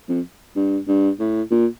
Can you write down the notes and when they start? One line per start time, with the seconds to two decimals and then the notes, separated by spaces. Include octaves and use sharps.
0.09 F2
0.56 G2
0.88 G2
1.20 A2
1.51 A#2